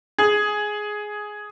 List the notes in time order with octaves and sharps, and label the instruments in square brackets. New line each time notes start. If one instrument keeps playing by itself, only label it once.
[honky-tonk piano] G#4